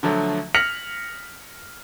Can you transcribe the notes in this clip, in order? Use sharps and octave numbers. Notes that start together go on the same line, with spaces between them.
D3 F3 F#3 A3
F6 A#6 B6 C#7 F7 F#7